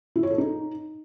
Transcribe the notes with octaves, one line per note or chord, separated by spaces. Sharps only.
E4
C#5
A4
D#4